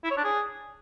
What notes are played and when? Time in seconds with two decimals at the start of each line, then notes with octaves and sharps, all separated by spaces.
0.04 E4
0.11 C#5
0.17 D4
0.24 G#4